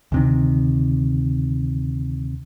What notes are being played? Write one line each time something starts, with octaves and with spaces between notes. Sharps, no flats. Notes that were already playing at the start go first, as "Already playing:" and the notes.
D2 C3 D#3